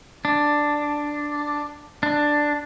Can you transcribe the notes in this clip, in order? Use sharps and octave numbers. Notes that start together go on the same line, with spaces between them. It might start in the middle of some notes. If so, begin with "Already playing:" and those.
D4
D4